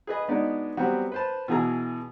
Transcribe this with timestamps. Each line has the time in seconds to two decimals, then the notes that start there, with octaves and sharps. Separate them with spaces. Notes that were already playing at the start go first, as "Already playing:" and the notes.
0.07 G#4 B4 D#5
0.28 G#3 B3 D4 D#4 F#4 D5
0.77 F#3 G3 B3 C4 F#4
1.12 B4 C5 A5
1.48 B2 E3 F#4 G#4 A#5